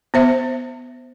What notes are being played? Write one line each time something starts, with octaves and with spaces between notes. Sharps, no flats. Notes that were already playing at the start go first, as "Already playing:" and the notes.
B3 C5 E5